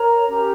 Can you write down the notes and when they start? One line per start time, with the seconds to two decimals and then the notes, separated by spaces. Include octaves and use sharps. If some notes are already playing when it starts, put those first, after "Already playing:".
Already playing: A#4 C#5 A#5
0.28 C#4 G4 A#4